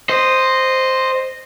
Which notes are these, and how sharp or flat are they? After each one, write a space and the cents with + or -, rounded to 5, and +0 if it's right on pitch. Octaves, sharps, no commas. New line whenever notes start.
C5 +0 D#5 -10